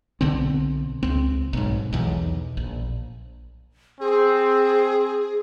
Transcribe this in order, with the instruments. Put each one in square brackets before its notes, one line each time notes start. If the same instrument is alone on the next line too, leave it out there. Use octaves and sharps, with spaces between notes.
[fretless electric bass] B1 D3 B3 C4
C#2 C4
B1 G#2
B1 E2
A#1
[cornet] C4 [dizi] G#4